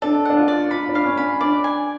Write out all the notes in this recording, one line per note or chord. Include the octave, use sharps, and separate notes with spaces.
D4 A4
D4 F#5
F4
D5
F4 B5
D4
F5
C#4
B5
D4 D5
G#5